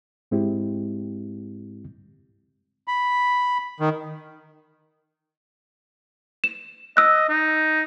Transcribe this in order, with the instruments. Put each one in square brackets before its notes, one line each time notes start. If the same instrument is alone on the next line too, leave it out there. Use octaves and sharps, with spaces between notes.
[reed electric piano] G#2 G#3 C4 E4 G4
[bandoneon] B5
D#3
[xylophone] E7
[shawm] D#5 [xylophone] E6 F#6
[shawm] D#4